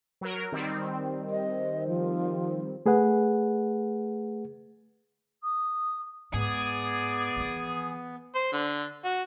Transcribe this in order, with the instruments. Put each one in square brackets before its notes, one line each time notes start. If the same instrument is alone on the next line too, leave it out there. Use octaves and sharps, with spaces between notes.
[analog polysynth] F#3 A#4
D#3 G3 C4
[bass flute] D#5
F3
[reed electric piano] A3 G#4 B4 F#5
[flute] D#6
[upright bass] G#2 [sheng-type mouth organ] B3 [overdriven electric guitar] G#4 [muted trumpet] D5
[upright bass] D#3 E3
[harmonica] C5
D3
F#4